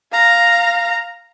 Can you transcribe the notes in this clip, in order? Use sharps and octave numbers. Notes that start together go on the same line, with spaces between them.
F5 A#5